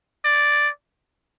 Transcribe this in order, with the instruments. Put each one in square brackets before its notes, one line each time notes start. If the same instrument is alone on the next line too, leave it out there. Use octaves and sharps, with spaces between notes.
[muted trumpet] D5